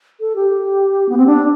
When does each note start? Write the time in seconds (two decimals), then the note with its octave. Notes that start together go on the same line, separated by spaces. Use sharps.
0.20 A4
0.36 G4
1.09 B3
1.17 C4
1.26 D4